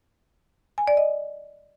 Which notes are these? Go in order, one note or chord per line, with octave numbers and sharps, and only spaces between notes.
G#5
D5
D#5